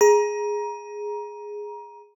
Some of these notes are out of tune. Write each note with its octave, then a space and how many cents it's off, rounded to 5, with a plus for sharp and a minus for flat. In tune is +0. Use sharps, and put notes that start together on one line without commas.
G#4 +0 A#5 +25